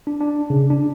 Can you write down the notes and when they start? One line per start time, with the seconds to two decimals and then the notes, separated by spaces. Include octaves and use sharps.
0.07 D4
0.21 D4
0.50 C#3
0.70 D4